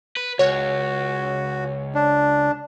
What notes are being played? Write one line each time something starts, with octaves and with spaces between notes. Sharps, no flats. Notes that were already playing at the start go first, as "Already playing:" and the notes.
B4
C#2 F#4 C#5
D4